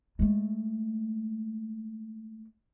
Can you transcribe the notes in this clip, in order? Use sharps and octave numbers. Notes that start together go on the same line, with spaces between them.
G#3 A3